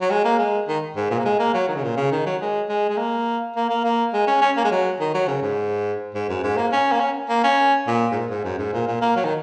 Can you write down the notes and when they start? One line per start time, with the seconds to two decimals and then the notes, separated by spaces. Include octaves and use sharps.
0.01 F#3
0.11 G#3
0.24 A#3
0.38 G#3
0.68 D#3
0.96 G#2
1.10 A#2
1.19 A#3
1.25 G#3
1.39 A#3
1.54 F#3
1.68 D#3
1.75 C#3
1.83 A#2
1.97 C#3
2.11 D#3
2.26 F#3
2.41 G#3
2.69 G#3
2.89 G#3
2.97 A#3
3.56 A#3
3.70 A#3
3.84 A#3
4.13 G#3
4.27 C#4
4.41 C#4
4.57 A#3
4.64 G#3
4.71 F#3
5.00 D#3
5.14 F#3
5.27 C#3
5.42 G#2
6.14 G#2
6.29 F#2
6.43 G#2
6.57 A#3
6.72 C#4
6.92 A#3
7.00 C#4
7.29 A#3
7.43 C#4
7.87 A#2
8.12 G#2
8.15 A#2
8.30 G#2
8.44 F#2
8.59 G#2
8.73 A#2
8.88 A#2
9.01 A#3
9.16 F#3
9.25 D#3